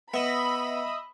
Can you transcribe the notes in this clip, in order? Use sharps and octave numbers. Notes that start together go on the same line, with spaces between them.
B3 D#5 E5 B5